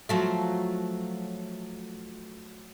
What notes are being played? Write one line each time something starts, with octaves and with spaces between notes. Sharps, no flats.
F3 F#3 A3